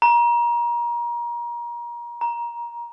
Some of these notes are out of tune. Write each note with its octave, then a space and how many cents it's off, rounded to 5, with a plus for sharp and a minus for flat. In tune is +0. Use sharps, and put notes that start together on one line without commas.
A#5 +30
A#5 +20